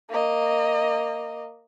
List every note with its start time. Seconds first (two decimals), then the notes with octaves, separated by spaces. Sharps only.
0.10 A#3 D#5